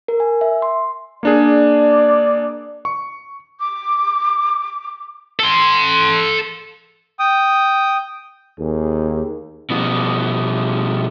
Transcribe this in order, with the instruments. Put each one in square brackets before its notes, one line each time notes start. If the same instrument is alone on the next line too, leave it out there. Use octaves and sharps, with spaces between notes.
[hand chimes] A#4
G#5
E5
C6
[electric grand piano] A#3 D4 G#4 [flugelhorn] D5
[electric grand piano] C#6
[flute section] D6
[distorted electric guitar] A4 C6
[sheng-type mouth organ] G5 D#6
[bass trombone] D#2 [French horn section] G#4
[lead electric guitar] B2 F3